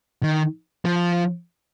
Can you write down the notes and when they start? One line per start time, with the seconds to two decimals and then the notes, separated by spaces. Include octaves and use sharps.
0.23 D#3
0.85 F3